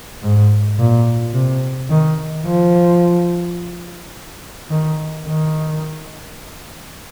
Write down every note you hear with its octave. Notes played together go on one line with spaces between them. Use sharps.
G#2
A#2
C3
D#3
F3
D#3
D#3